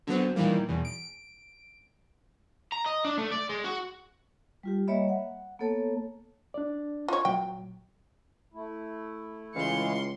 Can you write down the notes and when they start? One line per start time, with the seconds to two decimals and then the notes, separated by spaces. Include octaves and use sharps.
0.07 D3 F#3 B3 C4
0.36 A#2 D#3 E3 G3 A#3
0.69 E2 B2
0.85 D7
2.72 A#5
2.86 D#5
3.05 D4
3.18 A3
3.32 D5
3.49 G#3
3.64 F#4
4.63 G3 F4 G4
4.88 G3 A#3 C#5 D#5 E5 B5
5.09 F#5
5.59 A#3 B3 A4 C#5 A5
6.54 D4 D5
7.08 F4 C#5
7.25 A#2 F#3 G5
8.54 A3 E4
9.55 C#2 E3 G#3 F5 C6 C#7